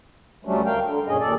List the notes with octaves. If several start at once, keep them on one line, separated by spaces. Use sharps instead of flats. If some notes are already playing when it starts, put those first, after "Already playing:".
D2 F#3 G3 A3 C#4 D4
D2 A#4 F5 G5
D3
F#2 A#2 C#4 G#4 D#5
D#2 A#2 A4 D5